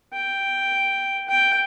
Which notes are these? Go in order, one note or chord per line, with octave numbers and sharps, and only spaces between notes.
G5
G5